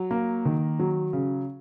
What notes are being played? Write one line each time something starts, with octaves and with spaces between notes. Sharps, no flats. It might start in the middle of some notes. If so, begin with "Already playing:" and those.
Already playing: F#3
A#3
D#3
F#3
C#3